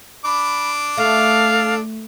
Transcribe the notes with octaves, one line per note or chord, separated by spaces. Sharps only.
D4 B5 D6
A3 A4 F5